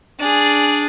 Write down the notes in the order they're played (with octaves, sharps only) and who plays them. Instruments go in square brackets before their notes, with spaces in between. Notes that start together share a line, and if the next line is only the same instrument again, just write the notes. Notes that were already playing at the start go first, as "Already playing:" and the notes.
[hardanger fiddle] D4 G#4